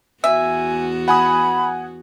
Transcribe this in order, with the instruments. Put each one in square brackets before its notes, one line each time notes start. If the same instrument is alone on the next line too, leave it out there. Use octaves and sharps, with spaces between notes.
[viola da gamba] E2 B3 F#4 [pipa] E5 [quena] G#5
[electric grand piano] F#5 G#5 D#6 [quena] B5